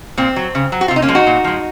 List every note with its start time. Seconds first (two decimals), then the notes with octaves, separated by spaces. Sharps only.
0.17 A#2 C4
0.36 F#3
0.55 C#3
0.72 F#3
0.81 F#4
0.88 F4
0.91 C3
0.96 D#4
1.02 A#3 C#4
1.08 F3 G#3
1.15 D#4 F#4
1.27 A#2
1.44 F3 G#3